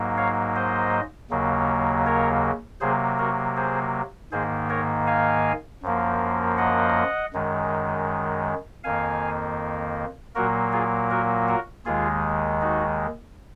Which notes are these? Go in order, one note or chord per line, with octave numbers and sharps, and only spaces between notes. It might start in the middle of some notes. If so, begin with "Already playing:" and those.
Already playing: G#2 F#3 A#3
C#5 F5
C5 D#5
D#2 C#3 F#3 A#3
A#4 C#5
C3 F#3 A#3 G#4 C5
F#4 A#4
G#4 C5
G#2 D#3 A#3 G#4 C5
A#4 C#5
F5 G#5
F#2 F3 A#3
D#5 F#5
F#2 D#3 G#3
F2 D#3 A#3 F5 G#5
A#2 F#3 A#3 F#4 A#4
F4 G#4
F#4 A#4
F#4 A#4
D#2 D#3 G#3 F4 G#4
D#4 F#4